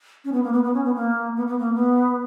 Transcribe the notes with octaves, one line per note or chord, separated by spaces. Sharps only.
C#4
B3
A#3
B3
B3
C#4
B3
A#3
B3
B3
A#3
B3